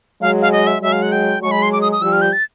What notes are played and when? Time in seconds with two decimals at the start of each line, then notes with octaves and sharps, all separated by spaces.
0.21 F#3 G#3 F5
0.42 F5
0.52 D#5
0.67 E5
0.82 F#3 G#3 E5
0.92 F5
1.02 F#5
1.12 G5
1.42 F#3 G#3 C#6
1.51 B5
1.62 C6
1.73 D6
1.81 D#6
1.92 D#6
2.02 F3 G3 E6
2.13 F6
2.22 G6
2.33 A6